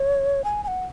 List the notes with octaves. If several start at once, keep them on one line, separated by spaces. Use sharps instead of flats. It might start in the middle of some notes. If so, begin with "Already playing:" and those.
Already playing: C#5
G#5
G#5
F#5